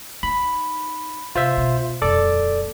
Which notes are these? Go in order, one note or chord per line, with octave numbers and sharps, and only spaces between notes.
D#4 B5
C3 F4 C5 E5
B2
D#1 F2 A4 D5 D6